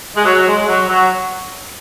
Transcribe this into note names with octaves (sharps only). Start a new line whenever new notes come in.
G#3
F#3
G#3
F#3
F#3